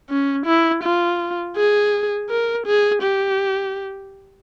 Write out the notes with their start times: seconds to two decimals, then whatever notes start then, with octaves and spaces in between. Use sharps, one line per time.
0.10 C#4
0.46 E4
0.83 F4
1.56 G#4
2.30 A#4
2.66 G#4
3.03 G4